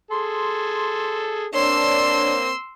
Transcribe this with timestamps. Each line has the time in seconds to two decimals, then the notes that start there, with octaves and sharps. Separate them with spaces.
0.11 G#4 A4 C6
1.54 A#3 C4 D4 C#5 C6 E6